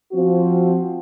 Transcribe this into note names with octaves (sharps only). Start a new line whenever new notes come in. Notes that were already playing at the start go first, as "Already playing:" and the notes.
F3 C4 F#4